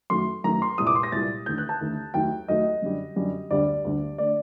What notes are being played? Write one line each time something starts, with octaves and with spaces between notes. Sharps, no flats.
F#2 D#3 F#3 A3 C6
F#2 D#3 F#3 A3 A#5
C6
C2 A#2 G3 D#6
D6
C6
A#6
C2 A#2 G3 A6
D#2 D3 A3 G6
F#6
A5
D#2 D3 A3
D#2 D#3 F#3 A3 G5
D#2 D#3 F#3 A3 D#5
F#2 D3 G3
F#2 D3 G3
D2 D3 G3 D5
D2 D3 G3
D3 A3 D5